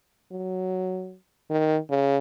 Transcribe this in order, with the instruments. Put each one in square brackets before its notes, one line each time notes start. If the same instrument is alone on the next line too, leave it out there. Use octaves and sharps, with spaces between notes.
[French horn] F#3
D#3
C#3